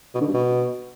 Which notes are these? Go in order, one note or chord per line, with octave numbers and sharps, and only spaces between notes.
B2
D3
G2
B2